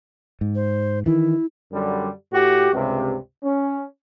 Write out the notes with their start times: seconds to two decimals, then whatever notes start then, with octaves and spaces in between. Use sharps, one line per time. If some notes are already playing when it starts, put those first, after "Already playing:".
0.41 G#2
0.55 C5
1.06 D#3 E3 E4
1.72 F#2 D3 G3
2.33 A2 F#4 G4
2.73 C#2 G2 C3
3.43 C#4